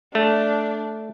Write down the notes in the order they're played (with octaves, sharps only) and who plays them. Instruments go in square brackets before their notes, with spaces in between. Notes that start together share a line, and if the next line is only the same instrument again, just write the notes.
[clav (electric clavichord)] A3 [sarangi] D4